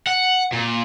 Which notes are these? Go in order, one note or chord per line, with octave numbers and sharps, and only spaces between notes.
F#5
A#2